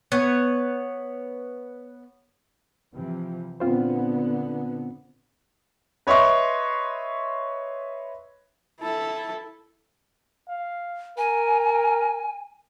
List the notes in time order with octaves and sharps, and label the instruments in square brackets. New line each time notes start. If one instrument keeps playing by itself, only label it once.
[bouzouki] B3 C#5
[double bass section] C3 E3 F3
[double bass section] A#2 D3 B3 [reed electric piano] C4 F4 C5
[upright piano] B4 C#5 D#5 E5 C6 C#6
[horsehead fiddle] E4 A4
[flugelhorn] F5
[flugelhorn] A#4 [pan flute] G#5